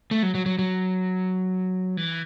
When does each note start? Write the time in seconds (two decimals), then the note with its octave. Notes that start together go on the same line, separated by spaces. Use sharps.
0.11 A3
0.23 F#3
0.35 F#3
0.46 F#3
0.59 F#3
1.97 E3